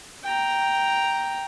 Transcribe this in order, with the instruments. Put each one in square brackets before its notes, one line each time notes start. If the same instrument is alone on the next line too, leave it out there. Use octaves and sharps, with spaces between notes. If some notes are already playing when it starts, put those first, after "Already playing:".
[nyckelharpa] G5 A#5